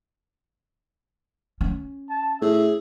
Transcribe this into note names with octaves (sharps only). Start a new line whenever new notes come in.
C#4
A5
A2 G#4 E5